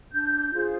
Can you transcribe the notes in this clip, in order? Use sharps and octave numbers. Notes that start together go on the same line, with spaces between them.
D4 G6
F4 G#4 C5